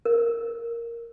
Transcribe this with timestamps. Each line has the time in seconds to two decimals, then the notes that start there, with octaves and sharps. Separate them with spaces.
0.05 A#4